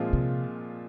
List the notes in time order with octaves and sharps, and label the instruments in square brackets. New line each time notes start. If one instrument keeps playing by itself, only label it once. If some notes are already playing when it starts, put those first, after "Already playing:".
Already playing: [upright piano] A#2 F3 G#3 C4 F4
[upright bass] C3